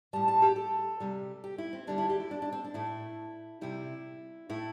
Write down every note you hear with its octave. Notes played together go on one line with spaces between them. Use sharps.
A2 G3 A5
A5
G4
A4
C3 G3
G4
E4
C4
D3 G3 D4
E4
G4
E4
D4
D4
C4
D4
A2 A3 E4
C3 G3 E4
A2 A3 E4